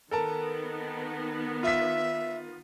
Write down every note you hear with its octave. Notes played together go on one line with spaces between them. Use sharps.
D#3 B3 A4 A#4 A5
F4 E5 B6